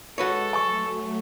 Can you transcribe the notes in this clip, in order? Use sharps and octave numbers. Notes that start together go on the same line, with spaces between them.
G#3 F#4 A4 B4 C#5 F#5
F#3 A3 G#5 C#6